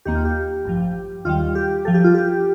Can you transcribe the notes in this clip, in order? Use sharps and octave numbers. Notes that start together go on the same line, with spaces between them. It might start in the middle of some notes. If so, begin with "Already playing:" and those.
D#2 D#3 A#3 G4
F4
G4
A1 G2 F3
D#2 D#3 G3 F4
G4
G1 G2 F3 A4
G4
F4
G4